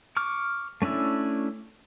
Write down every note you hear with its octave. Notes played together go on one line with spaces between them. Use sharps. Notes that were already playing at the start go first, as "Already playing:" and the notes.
C#6 D6 F6
A3 C#4 D4 E4